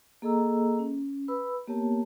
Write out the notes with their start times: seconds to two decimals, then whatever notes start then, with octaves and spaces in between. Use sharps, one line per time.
0.22 A#3 G#4 A4 D#5 A#5 E6
0.79 C#4
1.28 B4 B5 E6
1.68 A#3 B3 G4 A#4 C#5 A5